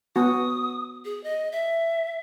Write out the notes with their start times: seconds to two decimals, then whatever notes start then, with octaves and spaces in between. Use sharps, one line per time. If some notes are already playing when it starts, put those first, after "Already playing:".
0.16 B3 F#4 D#6
1.05 G#4
1.24 D#5
1.52 E5